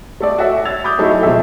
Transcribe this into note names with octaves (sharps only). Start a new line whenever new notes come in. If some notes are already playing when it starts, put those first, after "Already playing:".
A3 A4 D5
F#4 C#5 E5
E6 G#6 A6 F7
B5 D6 D#6 G6
F#3 A3 D#4 E4 F#4 G#4
D#1 B2 F3 G#3 A4 E5